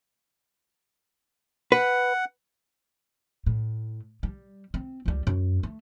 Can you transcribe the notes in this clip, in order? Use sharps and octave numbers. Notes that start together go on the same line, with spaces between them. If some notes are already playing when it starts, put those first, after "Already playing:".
B4 F#5
A2
G3
C4
C#2 G3
F#2
A3